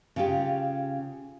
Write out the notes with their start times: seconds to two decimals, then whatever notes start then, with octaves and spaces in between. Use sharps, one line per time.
0.16 C#3 F4 G4